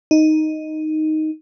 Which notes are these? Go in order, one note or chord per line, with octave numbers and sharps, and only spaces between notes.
D#4